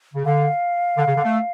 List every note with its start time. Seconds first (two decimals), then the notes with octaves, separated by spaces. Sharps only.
0.14 C#3
0.25 D3 F5
0.96 D3
1.06 C#3
1.16 D3
1.23 A3